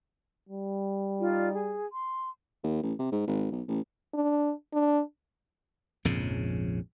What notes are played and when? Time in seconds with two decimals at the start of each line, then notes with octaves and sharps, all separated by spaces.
0.49 G3
1.19 D#4 F4 D5
1.53 G#4
1.91 C6
2.64 D#2
2.83 A1
2.99 C3
3.12 G#2
3.27 G#1
3.52 B1
3.68 A1
4.14 D4
4.73 D4
6.05 A#1 F2 G#2 C#3